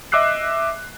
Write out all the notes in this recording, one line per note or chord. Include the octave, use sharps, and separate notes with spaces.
D#5 E5 D6 E6 F#6 C7